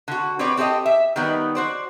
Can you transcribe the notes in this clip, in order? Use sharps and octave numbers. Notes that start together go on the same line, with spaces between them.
D3 F#4
C4 B4 C#5 D5
C4 G4 A4 D5 D#5
E5
D#3 F#3 G3 B3 D#4
F#4 C5 D5